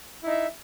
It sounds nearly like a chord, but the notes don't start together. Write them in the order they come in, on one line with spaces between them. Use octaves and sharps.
E4 D#4 E5